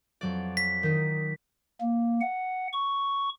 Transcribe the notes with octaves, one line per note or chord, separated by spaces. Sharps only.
F2 F#3 D5
B6
D#3 D#4
A#3
F#5
C#6